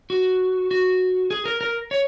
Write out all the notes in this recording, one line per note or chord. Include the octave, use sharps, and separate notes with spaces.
F#4
F#4
G#4
A#4
A#4
C#5